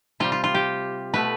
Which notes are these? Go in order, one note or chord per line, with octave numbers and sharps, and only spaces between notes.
C3 G3 F4
F4
F4
G4
B2 A3 B4